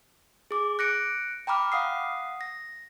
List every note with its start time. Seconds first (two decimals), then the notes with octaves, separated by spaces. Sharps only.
0.51 G#4 D6
0.79 F#6 A#6 C#7 D7
1.47 G5 A#5 B5 D6 F6
1.72 F5 F#5 D#6 C7
2.41 A#6